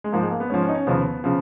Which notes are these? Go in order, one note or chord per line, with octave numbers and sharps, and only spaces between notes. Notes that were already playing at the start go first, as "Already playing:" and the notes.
G#3
G#2 F3 A#3
G#3
A#3
B3
G#2 F3 C#4
C#4
D#4
C#4
D#2 C#3 F3 B3
C#3 F3